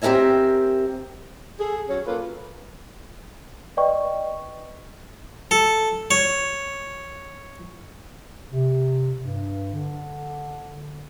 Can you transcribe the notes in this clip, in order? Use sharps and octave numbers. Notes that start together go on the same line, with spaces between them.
C4 G4 A4 A#4 E5 G#5
G#4 A4
F#3 C#4 C#5
A#3 F4 A4 B4
B4 D5 D#5 G5 C#6
A4
C#5
C3
G2
D3